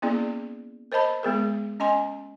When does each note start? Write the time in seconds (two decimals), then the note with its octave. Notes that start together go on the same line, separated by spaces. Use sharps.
0.02 A#3 B3 C#4 E4 G#4 D5
0.92 A#4 C5 D#5 A5 B5
1.23 G#3 B3 G#4 A#4
1.80 C#4 D#5 G#5 C6